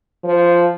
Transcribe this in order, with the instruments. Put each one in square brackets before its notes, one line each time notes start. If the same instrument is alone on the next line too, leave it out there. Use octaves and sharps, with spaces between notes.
[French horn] F3